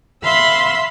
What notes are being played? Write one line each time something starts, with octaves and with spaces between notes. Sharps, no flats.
E5 F5 B5 C6 E6